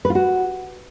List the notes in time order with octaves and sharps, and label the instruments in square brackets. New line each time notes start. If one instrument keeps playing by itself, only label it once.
[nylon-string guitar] B4
F4
F#4